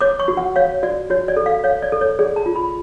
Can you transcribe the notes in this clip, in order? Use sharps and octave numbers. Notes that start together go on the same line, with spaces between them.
C#5 D6
C#6
F#4
F#5
C#5 F5
F#4 D5
F#4 C#5
D5
A4
F5
C#5 F5
D5
A4
C#5
G#4 D5
A5
F4
B5